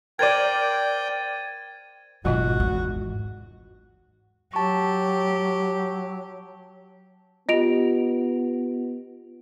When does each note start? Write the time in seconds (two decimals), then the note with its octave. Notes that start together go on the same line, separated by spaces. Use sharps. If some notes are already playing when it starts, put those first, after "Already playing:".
0.19 A#4 C5 D5 G5 G#6 A6 D#7
2.25 G#1 F2 B2 F#3 F4 F#4 D#5
2.60 E2
4.54 F#3 G4 A5 C#6
7.49 B3 F4 G4 D#5 D7 F7